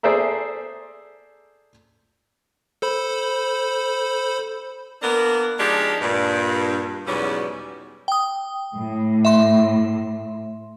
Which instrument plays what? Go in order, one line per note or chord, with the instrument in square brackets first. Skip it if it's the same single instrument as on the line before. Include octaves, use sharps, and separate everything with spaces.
[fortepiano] G#4 A4 C5 D5 E5 A#5
[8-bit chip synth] A4 C5 B5
[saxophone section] A#3 B3 D4 A#4
F3 G#3 D4 D#4 G4
G2 A#2
E2 G#2 B2 F#3 G3 C#4
[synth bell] G5 D#6
[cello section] A2
[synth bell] E5 C6